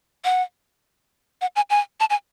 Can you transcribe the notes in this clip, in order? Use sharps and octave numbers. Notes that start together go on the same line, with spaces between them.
F#5
F#5
G#5
G#5
A5
G#5